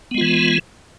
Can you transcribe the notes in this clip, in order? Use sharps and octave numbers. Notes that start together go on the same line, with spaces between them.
E3 G#3 B3 F4